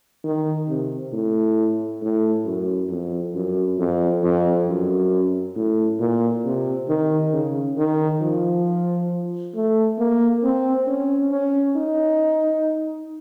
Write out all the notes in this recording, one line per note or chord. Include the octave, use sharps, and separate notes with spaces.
D#3
C3
A2
A2
F#2
F2
F#2
F2
F2
F#2
A2
A#2
C3
D#3
C#3
D#3
F3
A3
A#3
C4
C#4
C#4
D#4